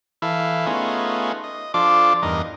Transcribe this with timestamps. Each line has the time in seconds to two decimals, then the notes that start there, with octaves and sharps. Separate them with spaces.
0.22 E3 E4 A4 F5
0.66 A3 B3 C#4 D#4 F4 G#4
1.44 D#5
1.74 F3 D4 F4 A4 D5 D6
2.22 E2 G2 D#4 A#4 D#5